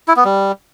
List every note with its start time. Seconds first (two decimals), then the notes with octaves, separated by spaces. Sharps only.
0.08 E4
0.16 B3
0.25 G3